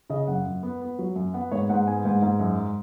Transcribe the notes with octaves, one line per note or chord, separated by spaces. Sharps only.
C#3 D#5
F#2 F#5
F#2
B3
B3
F#3
F#2
B3 F#5
G#2 C#5
G#2 F#5
B3 G#5
G#2
G#2
F#2